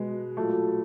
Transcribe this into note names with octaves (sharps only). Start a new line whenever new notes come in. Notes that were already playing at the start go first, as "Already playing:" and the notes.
Already playing: B2 G#3 B4
A#2 F#3 A3